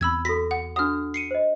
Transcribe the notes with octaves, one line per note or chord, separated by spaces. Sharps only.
E2 C4 B5 E6 G#6
F#4 A4 A#6 B6
F#5
D4 F#4 F#5 D#6 F6
C7 C#7 D#7
C5 D#5